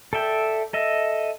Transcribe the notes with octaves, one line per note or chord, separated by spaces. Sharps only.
A4 D5 E5 G5
A4 D#5 E5